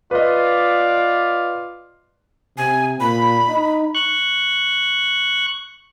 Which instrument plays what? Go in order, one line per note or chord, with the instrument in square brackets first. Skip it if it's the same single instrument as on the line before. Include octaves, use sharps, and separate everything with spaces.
[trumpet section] F4 D5 [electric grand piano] B4 D#5
[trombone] C3 [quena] G#5
[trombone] A#2 [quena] B5
[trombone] D#4
[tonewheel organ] C#6 F#6